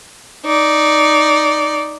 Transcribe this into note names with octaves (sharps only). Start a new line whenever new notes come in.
D#4 D5